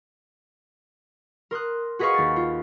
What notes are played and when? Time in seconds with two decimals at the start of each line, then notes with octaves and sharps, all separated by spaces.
1.51 A#4 C6 D#6 F#6
1.99 F#4 G#4 B4 D#5 F5 C#6
2.14 D#2 A6
2.36 F4